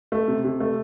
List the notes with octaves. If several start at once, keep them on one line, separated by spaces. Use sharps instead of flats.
A3
C3
C3
A3